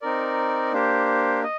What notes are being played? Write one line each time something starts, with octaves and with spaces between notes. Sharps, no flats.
C4 D#4 A#4 D5
A#3 D4 G4 C5
D#5